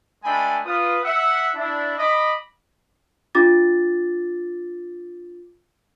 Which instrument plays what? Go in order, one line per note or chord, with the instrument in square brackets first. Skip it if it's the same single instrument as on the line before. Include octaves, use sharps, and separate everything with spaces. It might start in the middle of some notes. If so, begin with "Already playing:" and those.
[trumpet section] G#3 A3 D4 G5 G#5 B5
F4 B4 D#6
E5 F#5
D4 E4
D#5 B5 D6
[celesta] D4 F4 D6 A6